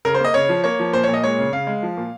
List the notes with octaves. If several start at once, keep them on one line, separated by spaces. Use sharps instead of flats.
C#3 A#4
C5
A#3 D#5
C#3 C#5
F3
A#3 C#5
F3
A#2 C5
C#5
A#2
D#5
G#3 C#5
C#3
C#3 F5
G#3
F3
A#2